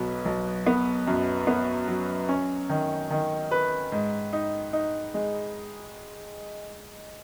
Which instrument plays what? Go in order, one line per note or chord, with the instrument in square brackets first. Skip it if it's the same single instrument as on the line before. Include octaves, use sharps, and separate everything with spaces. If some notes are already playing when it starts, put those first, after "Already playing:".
Already playing: [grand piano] B1 B2 B3
B1
B3
F#2
B3
F#3
C#4
D#3
D#3
B4
G#2
D#4
D#4
G#3